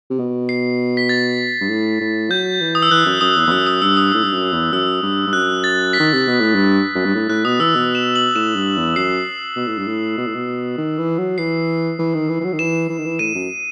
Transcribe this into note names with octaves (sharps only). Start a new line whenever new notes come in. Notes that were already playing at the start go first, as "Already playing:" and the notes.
C3
B2
C7
B6
A6
G2
A2
A2
F#3 G6
E3
D#6
E6
E3 F#6
F#2
F#2 D#6
E2
E2
F#2 E6
D#6
G2 E6
D#6
A2 E6
G2
F#2
E2
F#2 E6
G2
G2
F#2 F#6
A6
B6
D#3
C3
B2
A2
G2
F#2
G2
A2
A2 F#6
B2 D#6
E3 E6
B2
E7
F#7
A2 E7
G2
E2
F#2 C7
B2
A2
G2
A2
B2
A2
B2
D#3
E3
F#3
E3 C7
E3
D#3
E3
E3
F#3
D#3
E3 E7
E3
D#3
E3
A2 D#7
F#2